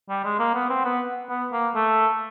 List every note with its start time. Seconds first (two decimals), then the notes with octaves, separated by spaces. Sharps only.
0.09 G3
0.24 G#3
0.39 A#3
0.54 B3
0.69 C4
0.85 B3
1.30 B3
1.52 A#3
1.75 A3